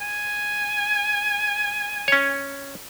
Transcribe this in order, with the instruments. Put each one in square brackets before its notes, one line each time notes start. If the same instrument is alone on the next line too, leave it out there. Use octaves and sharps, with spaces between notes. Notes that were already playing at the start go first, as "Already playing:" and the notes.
[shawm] G#5
[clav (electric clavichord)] C#4 C#5